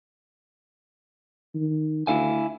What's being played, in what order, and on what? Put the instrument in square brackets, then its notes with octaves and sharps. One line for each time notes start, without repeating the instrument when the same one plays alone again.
[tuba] D#3
[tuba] D2 [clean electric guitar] E4 F5 G#5